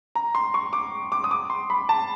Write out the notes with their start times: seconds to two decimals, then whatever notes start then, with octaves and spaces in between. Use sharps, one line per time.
0.15 A#5
0.35 C6
0.54 C#6
0.73 D6
1.12 D6
1.24 D#6
1.31 D6
1.50 C6
1.70 B5
1.89 A5